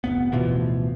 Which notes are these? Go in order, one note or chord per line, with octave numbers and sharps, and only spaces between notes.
F1 D#2 B3
D1 B2 E3 F3